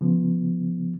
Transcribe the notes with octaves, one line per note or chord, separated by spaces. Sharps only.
C#3 F3 B3